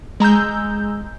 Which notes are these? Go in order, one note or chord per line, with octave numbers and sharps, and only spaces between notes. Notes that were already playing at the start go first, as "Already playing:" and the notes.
G#3 A#5 E6 G6